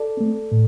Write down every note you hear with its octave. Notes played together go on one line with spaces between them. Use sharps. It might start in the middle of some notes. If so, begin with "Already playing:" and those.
Already playing: A4 D5
A3 C4
A2